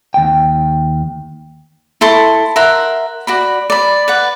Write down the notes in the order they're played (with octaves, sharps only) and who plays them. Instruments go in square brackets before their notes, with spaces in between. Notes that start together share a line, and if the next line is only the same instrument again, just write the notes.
[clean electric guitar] D#2 G5
[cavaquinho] E4 A4 C6 C#6
A#4 E5 F#5 C6
F#4 D5 B5
D5 B5
B4 D5 F#5